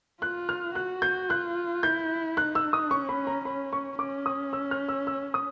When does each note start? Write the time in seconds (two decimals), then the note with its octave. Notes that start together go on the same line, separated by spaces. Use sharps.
0.22 F4 F#6
0.49 F6
0.75 F#4 F#6
1.02 G6
1.29 F4 F#6
1.83 E4 G6
2.37 D#4 F#6
2.55 E6
2.73 D#6
2.91 C#4 C#6
3.09 B5
3.27 A#5
3.45 C#4 B5
3.73 C#6
3.99 C#4 D6
4.26 D#6
4.53 E6
4.71 F6
4.89 E6
5.07 E6
5.34 D#6